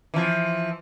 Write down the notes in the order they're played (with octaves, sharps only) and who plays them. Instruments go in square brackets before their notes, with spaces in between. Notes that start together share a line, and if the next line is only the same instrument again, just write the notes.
[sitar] E3 F3